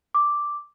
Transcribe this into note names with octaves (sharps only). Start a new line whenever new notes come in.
D6